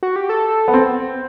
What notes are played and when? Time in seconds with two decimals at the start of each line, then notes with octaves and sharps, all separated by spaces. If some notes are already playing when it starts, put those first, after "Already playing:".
0.03 F#4
0.16 G4
0.29 A4
0.68 B3
0.74 C4